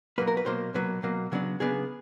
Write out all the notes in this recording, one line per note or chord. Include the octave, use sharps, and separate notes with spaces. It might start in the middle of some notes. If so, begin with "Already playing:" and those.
B2 F#3 A#3 B4
A#4
B4
B2 F#3 A#3 C5
B2 F#3 A#3 B4
B2 F#3 A#3
C#3 F#3 B3 D4
C#3 F#3 B3 D4 G#4